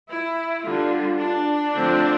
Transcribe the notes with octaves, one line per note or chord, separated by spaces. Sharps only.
E4
D3 G3 D4 F4
D4
D3 F3 A3 C4